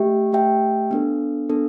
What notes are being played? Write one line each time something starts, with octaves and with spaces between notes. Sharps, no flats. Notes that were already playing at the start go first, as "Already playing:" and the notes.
Already playing: A3 G4 E5 G5
A3 G4 E5 G5
B3 D4 A4
B3 D4 A4